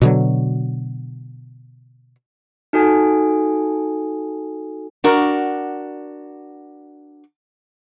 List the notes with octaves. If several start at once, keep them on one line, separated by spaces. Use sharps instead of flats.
B2 D3 F#3
D#4 F#4 A4 G#5
D4 F#4 A#4